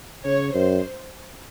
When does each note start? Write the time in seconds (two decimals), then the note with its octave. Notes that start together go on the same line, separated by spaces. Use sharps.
0.25 C#3 C#5
0.54 F#2 C5